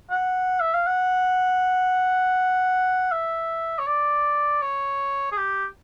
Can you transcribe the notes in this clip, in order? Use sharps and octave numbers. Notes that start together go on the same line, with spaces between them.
F#5
E5
F5
F#5
E5
C#5
D5
C#5
G#4
G4